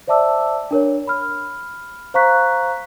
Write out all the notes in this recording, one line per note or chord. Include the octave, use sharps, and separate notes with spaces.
C5 D5 E5 A5 D6 E6
D4 A#4 C#5
B5 F6
C5 F5 A#5 C#6 F#6 B6